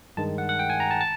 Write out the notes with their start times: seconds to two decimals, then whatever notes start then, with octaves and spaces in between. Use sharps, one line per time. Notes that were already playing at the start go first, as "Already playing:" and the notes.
0.17 G2 D#3 G#3 A5
0.38 F#5
0.49 F#5
0.59 G5
0.70 G#5
0.80 A#5
0.91 A5
1.01 A5